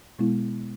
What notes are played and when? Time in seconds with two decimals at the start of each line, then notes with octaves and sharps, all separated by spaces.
0.19 B2 G#3 B3 E4